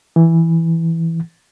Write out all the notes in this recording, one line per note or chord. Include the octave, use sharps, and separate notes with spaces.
E3